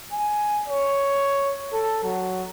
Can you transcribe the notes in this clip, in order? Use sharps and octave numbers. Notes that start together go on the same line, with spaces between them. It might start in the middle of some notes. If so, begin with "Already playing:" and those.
G#5
C#5
A4
F#3